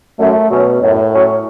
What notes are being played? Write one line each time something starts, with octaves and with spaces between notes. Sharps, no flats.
F#2 A3
B2 F#3 C#4
F#2 A2
F#3 C#4